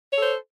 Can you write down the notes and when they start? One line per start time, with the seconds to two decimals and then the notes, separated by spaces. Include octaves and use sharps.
0.13 C#5
0.17 A4
0.22 C5